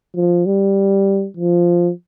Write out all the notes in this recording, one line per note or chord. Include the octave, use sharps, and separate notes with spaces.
F3
G3
F3